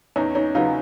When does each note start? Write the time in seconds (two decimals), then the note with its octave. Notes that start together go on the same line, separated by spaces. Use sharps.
0.16 E2 C#4 D#4
0.35 C#4 D#4
0.55 C#3 F#3 B3 D#4 F4